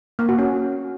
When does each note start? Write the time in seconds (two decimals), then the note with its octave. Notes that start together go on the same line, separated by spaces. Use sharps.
0.19 A#3
0.29 F#4
0.39 C#4